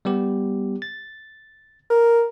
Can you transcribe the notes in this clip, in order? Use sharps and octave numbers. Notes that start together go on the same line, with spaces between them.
G3 B3 G4
A6
A#4